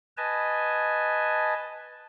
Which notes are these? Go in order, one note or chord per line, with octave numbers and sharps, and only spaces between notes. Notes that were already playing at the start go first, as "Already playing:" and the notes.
B4 D#5 G#5 A5